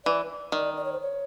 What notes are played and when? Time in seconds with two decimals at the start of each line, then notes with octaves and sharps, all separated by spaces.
0.05 E3 D5
0.52 D#3 D5
0.77 D5
0.84 C#5
0.93 C5
1.01 C#5